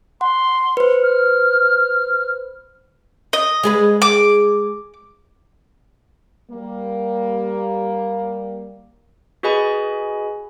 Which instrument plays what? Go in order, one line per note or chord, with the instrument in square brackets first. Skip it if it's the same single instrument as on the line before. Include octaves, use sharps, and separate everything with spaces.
[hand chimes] F#5 [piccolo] C6
[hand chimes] B4 C5
[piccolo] F6
[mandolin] D#5
[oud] G#3 G#4 B4
[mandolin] D6
[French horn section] G3 A#3
[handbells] F#4 G#4 B4 D#5 G#5 B5